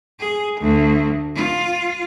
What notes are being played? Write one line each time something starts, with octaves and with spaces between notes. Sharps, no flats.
G#4
D2
F4